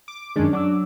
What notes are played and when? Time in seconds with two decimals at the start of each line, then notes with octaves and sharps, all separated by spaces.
0.08 D6
0.36 F#2 D#3 G#3 C#4 D4
0.53 F#3 D4 D6 E6